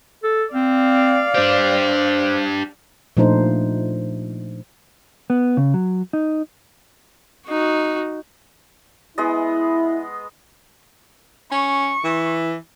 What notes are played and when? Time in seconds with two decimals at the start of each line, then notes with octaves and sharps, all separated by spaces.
0.23 A4
0.54 C4 D5 F5
1.35 D4 G4 C5
3.17 A#2 F3 A3 D4 D#4 C5
5.30 B3
5.57 C#3
5.74 F#3
6.13 D#4
7.48 D#4 F#4
9.18 G#3 B3 E4 D#5
11.52 C#4 C#6
12.04 E3